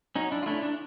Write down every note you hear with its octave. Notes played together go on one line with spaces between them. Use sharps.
F#3 C#4 D#4
D4 E4
F4
A3 C#4 D4 E4
D4